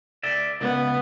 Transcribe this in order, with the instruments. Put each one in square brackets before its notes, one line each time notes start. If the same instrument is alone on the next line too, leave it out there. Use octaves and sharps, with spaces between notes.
[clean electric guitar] D5 E5
[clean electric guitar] C#2 [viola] B3